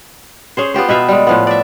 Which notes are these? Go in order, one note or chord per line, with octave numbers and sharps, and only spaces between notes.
C#4 G#4 C5
B3 F4 G4 C5
B2 B4 E5 F5
G3 G#3
A2 F3 B3
D5 E5